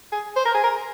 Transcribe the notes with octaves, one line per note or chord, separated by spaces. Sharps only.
G#4
C5
A#4
G#4
A#4